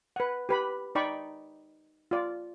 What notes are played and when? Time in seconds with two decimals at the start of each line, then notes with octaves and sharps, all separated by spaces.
0.16 B4 F#5
0.49 G4 B4 B5
0.95 D#4 D5 G5 B5 C#6
2.11 F4 D5